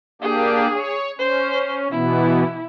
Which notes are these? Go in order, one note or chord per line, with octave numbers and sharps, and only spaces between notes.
A#3 D4 G4 G#4
C#5
C#4 C5
B2 E3 B3 E4